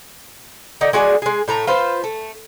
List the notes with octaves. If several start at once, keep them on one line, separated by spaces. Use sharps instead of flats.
D3 D#4 F#5
G#3 F#4 G#4 D5
G#3 G#4
A2 A3 A#5
F4 B4 C5
A3